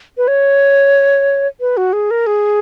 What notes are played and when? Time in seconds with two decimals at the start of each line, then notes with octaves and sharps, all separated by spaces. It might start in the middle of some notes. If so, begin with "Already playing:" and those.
0.17 B4
0.28 C#5
1.60 B4
1.77 F#4
1.93 G#4
2.11 A#4
2.27 G#4